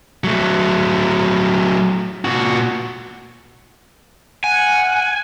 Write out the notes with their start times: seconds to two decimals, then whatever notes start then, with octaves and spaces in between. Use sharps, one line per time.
0.24 F#3 A3
2.25 A#2 F#4
4.44 F#5 G#5